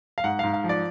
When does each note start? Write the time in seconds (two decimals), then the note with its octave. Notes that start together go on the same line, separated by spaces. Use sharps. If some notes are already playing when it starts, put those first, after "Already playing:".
0.18 F5
0.24 G#2 F#5
0.39 G#2 F5
0.54 F5
0.64 F3
0.69 D5